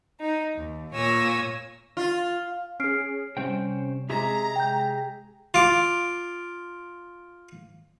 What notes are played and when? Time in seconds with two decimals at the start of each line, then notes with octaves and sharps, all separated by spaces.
0.20 D#4
0.56 D#2
0.95 A#2 A#3 C#5 G#5 E6 A#6
1.97 F4
2.80 C#4 G#4 F6 C7 D7
3.37 C3 G3 C#4 C5 G5
4.10 C3 G#3 G4 G#4 E5 A#5 A#6
4.56 G5 G6
5.54 F4 D6